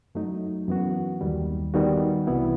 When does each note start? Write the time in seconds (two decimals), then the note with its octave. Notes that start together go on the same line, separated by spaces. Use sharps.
0.15 F#2 F#3 A3 D#4
0.68 F#2 E3 B3 F#4
1.21 D#2 D#3 G3
1.74 D#3 G3 B3 D#4 F#4
2.27 C2 C3 E3 B3 E4